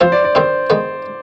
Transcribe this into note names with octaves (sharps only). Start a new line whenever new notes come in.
F3 C4 F4 C5
D5
D5
D#3 G3 C4 D#4 C5
D#3 G#3 B3